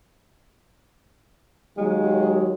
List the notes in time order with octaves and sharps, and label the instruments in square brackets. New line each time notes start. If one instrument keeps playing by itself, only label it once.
[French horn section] D#2 F#3 [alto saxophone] G#3